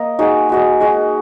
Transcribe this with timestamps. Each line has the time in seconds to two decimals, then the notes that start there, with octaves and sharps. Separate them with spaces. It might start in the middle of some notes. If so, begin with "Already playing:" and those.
Already playing: A#3 A#4 D#5
0.19 G#3 D#4 F#4
0.49 G#3 F#4 D#5
0.80 G#3 F#4 D#5